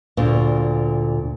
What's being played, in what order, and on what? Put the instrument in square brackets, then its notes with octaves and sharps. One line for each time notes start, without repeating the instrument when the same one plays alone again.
[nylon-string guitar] D2 A#2